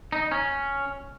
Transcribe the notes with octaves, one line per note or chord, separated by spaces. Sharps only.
D#4
C#4